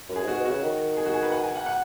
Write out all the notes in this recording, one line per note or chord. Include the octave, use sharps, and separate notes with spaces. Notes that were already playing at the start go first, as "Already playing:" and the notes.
F#2
G#4
G#2
F#4
B2
C#3 F#4
D#3
G#4
F#4
G#4
B4
F#5
G#5
F#5
F#5